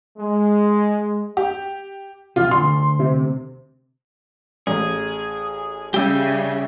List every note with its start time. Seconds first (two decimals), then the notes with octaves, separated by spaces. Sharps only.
0.17 G#3
1.37 G4
2.36 E2 C3 F4
2.51 D2 G#2 C6
2.99 C3
4.67 A1 G#4
5.94 C#3 G3 G4 E5 G6